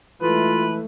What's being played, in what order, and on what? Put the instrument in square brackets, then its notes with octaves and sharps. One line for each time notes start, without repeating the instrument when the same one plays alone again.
[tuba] E3 [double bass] G#3 A3 [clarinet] F4 [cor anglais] B4